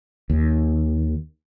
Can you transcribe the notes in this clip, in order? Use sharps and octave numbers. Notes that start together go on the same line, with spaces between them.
D#2